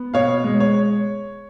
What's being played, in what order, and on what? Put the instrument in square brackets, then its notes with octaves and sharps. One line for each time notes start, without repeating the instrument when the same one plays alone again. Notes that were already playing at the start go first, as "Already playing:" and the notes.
Already playing: [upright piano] B3
B2 C#5 F5
G#3
C#5